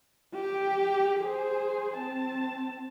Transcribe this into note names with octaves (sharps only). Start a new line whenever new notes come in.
G4
G#4 C5
C4 A5